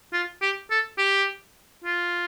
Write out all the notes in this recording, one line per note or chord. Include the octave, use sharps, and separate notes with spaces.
F4
G4
A4
G4
F4